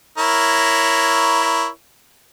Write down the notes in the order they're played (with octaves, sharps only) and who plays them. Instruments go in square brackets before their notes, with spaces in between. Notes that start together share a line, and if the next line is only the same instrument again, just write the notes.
[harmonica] E4 A#4 C#5